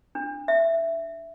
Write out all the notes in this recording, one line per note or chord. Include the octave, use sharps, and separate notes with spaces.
D4
E5